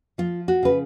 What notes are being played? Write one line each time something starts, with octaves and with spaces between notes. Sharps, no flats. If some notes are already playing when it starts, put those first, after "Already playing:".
F3 F4
F#4
C#3 B4